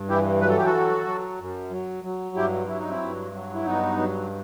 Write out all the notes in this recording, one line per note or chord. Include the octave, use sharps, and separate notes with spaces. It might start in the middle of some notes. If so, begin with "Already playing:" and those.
Already playing: G2
E3 E4 G4
F#3 B4
A4
G4
F#4 A4
F#3
F#3
F#2
F#3
F#3
G2 E4 G4
F#3 E4
D#4
C4 E4
G2
F#3
E4
G2 B3 D#4
F#3